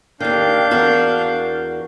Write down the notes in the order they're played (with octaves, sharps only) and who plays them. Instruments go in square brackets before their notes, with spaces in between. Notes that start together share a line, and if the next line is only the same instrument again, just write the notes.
[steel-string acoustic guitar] D#2 D#3 [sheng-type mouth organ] D4 F5 G6
[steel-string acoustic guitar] E2 F#4 A#4